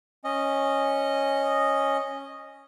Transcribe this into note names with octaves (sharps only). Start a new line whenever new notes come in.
C#4 D#5